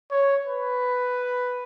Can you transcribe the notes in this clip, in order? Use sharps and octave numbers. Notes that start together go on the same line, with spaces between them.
C#5
B4